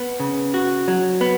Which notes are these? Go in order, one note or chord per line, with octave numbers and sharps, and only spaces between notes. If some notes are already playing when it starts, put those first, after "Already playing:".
Already playing: B3
C#3
F#4
F#3
B3